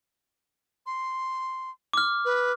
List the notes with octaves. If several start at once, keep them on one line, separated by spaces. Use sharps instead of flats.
C6
D6 F6
B4